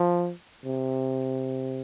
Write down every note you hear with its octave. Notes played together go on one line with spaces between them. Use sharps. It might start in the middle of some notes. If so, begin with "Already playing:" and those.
Already playing: F3
C3